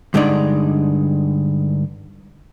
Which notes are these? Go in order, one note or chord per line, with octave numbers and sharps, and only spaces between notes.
G2 D3 G#3 D4 D#4 D5